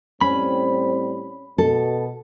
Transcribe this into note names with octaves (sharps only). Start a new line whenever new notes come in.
A2 G3 C4 C#4 B5
B2 A4